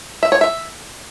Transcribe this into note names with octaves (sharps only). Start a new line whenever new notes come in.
E5
C#5
E5